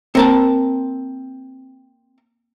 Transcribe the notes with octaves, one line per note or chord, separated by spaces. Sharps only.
A#3 C4 A#4 A5